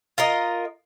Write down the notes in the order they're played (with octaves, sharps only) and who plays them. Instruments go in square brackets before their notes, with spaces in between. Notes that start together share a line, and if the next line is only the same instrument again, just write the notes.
[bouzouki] F4 A#4 D#5